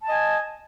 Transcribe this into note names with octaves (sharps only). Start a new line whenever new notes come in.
D#5 G#5 A5